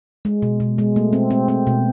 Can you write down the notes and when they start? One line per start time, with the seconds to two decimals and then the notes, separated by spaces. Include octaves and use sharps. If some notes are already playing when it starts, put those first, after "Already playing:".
0.25 G#3
0.42 B2
0.60 B2
0.78 G#3
0.96 A3
1.13 C4
1.31 C4
1.48 C4
1.67 B2